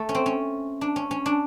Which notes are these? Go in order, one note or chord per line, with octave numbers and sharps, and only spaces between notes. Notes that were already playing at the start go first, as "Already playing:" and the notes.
Already playing: A3
C#4
C4
C#4
D4
C#4
C#4
D4